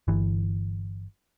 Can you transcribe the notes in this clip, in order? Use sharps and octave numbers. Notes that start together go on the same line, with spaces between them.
G1 E3